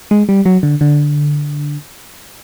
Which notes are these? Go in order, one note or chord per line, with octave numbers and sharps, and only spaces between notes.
G#3
G3
F#3
D3
D3